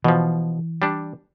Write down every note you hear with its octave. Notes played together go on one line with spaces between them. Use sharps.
B2 E3 F3
G3 D4